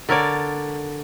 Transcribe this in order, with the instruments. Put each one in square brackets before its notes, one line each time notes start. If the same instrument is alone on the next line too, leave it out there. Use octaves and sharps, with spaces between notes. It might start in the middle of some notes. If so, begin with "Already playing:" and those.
[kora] D3 A#4 C#5 D5